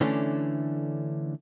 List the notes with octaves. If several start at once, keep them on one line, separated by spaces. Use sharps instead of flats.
D3 E3 A3 C#4 D4